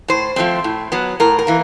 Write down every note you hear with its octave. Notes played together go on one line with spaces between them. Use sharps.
A2 C5
F3 A3 C4
A2
F#3 B3
A2 A#4
A#4
E3 A#3